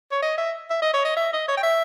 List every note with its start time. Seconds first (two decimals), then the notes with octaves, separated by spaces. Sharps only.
0.12 C#5
0.23 D#5
0.38 E5
0.70 E5
0.82 D#5
0.94 C#5
1.05 D#5
1.17 E5
1.33 D#5
1.48 C#5
1.57 G5
1.63 E5